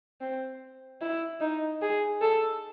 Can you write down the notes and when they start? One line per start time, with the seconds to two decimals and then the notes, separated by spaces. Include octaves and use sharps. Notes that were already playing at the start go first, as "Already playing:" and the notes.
0.21 C4
1.02 E4
1.41 D#4
1.82 G#4
2.22 A4